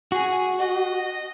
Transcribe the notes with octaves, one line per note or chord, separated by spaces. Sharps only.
F#4 G#4 G#5
D#5